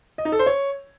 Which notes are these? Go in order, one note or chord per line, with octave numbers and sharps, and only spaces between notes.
D#5
D#4
A4
C5
C#5